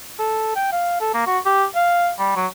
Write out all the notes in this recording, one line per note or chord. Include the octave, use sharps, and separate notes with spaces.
A4
G5
F5
A4
A#3
F#4
G4
F5
G3
F#3